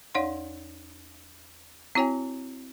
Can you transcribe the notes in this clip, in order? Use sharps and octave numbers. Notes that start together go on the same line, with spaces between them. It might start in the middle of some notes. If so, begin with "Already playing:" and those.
E2 D#4 C#5 D5 F#5 C6
C4 E4 F#4 C#5 G5 G#5